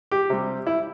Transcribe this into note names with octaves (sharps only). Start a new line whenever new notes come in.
G4
C3 G3
E4